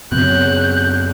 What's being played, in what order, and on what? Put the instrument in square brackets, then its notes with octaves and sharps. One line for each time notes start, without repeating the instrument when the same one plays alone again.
[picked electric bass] F#2 B3 C4 [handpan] C#3 F#3 [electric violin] F#6 [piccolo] G6